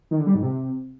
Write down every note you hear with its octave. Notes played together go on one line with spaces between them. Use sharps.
D#3
D3
G3
G#2
C3